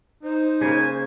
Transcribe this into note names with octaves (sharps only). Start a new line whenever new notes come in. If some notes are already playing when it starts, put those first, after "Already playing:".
D#4 C5
C#3 A#3 G#5